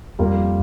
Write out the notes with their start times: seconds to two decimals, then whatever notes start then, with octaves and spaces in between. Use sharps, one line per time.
0.19 F2 G3 A#3 F4 A#4